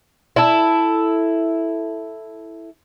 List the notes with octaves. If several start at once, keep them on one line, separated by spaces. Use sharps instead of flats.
E4 A4